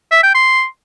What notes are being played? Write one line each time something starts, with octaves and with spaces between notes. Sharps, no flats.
E5
G5
C6